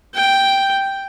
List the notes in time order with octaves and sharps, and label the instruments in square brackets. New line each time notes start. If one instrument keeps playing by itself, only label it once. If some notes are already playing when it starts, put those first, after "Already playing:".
[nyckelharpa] G5